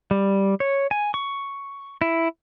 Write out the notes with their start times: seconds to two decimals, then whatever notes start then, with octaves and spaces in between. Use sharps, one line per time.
0.11 G3
0.60 C#5
0.91 G#5
1.14 C#6
2.02 E4